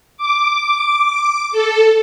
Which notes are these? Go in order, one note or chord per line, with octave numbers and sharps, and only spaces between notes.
D6
A4